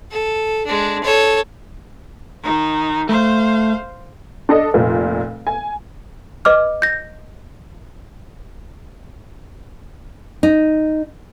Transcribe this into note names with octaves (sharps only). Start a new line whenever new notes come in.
A4
G#3 D4
A4 C#5
D#3 D#4
A3 C5 F5
D4 A4 D#5
F1 A#2
G#5
B4 D#5 D6 F6
G6 A#6
D#4